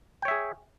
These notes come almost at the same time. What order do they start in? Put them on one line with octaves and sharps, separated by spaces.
G5 C#5 E5 G#4